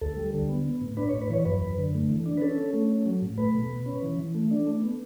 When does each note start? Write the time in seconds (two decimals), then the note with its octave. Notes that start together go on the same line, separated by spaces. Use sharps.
0.01 D2 A4
0.17 G3
0.34 D3
0.49 B3
0.65 B3
0.81 A2
0.97 D4 B4
1.09 C#5
1.13 A2
1.22 B4
1.30 E3 C#5
1.45 F#2 B4
1.62 F#2
1.78 D3
1.94 A3
2.09 E3
2.26 D4
2.37 B4
2.41 C#4 A4
2.58 C#4
2.73 A3
2.89 C#4
3.06 F#3
3.22 A2
3.38 A3 B4
3.55 B2
3.70 B2
3.86 C#4
4.02 E3
4.18 E3
4.35 A3
4.51 D4
4.67 A3
4.82 B3